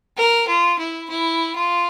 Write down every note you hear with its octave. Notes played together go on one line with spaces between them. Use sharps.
A#4
F4
E4
E4
F4